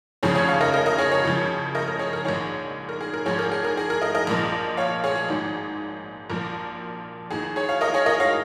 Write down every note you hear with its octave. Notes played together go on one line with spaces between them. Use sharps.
F1 D#2 C#3 F3 G#4 C#5
G#4 C#5
C#5 F5
A#4 D#5
A#4 D#5
A#4 D#5
G#4 C#5
G#4 C#5
C#2 C#3 F3
A#4 D#5
A#4
G#4 C#5
A#4
A#1 G#2 D#3 G#4 C#5
A#4
G#4
A#4
G#1 G#2 F3 G#4 C#5
A#4
G#4
A#4
G#4
A#4
A#4 D#5
A#4 D#5
A#1 A#2 F3
C#5 F5
G#4 C#5
G#4
G#1 G#2 D#3
A#1 A#2 F3 A#4
D#2 D#3 G#4
G#4 C#5
C#5 F5
A#4 D#5
G#4 C#5
A#4 D#5
C#5 F5